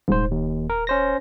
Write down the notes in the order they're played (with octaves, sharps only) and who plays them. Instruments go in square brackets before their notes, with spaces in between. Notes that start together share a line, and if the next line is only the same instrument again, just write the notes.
[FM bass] D#1 [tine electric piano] G#2 C5
[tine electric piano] D#2
A#4
C#4 C5 A#6